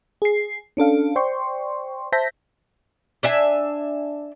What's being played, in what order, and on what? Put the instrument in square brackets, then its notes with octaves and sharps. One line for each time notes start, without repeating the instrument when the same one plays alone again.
[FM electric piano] G#4 C7
C#4 D4 A4 F5
C5 D5 G5 C6 C#6
C5 E5 A5 G6 A#6 B6
[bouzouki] D4 E5 G#5